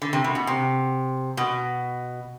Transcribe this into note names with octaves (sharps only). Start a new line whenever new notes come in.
D3
C3
B2
B2
C3
B2